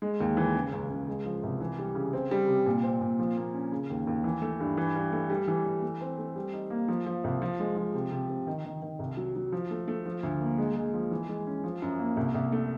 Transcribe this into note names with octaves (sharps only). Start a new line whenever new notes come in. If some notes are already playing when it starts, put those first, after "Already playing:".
G#3
D#2
E3
C#3
C#2
C#2
G#3
F3
C2
E3
G3
C#3
C4
G3
C3
A#2
C4
A#2
F3
A#3
C#4
C#3
D#2
D#2
E3
A3
G2
E3
G2
A3
G3
E3
E3
A3
C4
A3
G3
D#4
A#3
F3
F3
C2
F3
G#3
F3
C3
C3
C3
D#3
D#3
D#3
C2
F#3
F#3
F3
A3
A3
F3
D2
A#3
G#3
G#3
F3
E3
G#3
C#4
F3
F#2
A#3
C2
C2
A3